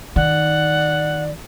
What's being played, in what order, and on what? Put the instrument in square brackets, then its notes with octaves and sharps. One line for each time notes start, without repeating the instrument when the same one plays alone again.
[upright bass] D#3 [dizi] D5 [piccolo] F#5